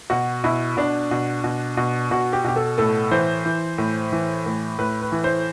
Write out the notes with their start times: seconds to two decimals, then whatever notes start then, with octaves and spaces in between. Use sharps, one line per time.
0.10 B2 F#4
0.44 B2 E4
0.77 B2 D4
1.11 B2
1.44 B2
1.77 B2
2.11 B2 F#4
2.33 G4
2.44 B2 G4
2.56 A4
2.78 A2 A4
3.11 E3 C5
3.45 E3
3.78 A2
4.12 E3
4.46 A2
4.79 A2 B4
5.02 B4
5.12 E3
5.24 C5